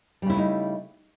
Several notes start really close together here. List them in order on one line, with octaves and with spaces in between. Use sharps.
G3 C#3 E4 A3 D#4